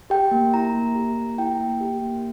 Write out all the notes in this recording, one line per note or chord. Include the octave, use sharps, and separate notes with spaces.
G4 G5
A#3
E4 A#5
A#3
G4
A#3
E4 G5
A#3
G4
A#3